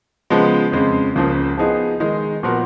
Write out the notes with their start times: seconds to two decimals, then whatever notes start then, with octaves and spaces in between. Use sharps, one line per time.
0.30 C#3 F3 G#3 B3
0.72 F2 C#3 G#3
1.15 C#2 C#3 F3 A#3
1.58 F3 B3 D#4 G#4
2.00 D#3 G#3 D#4 G#4
2.43 A#2 F3 B3 F#4 A#4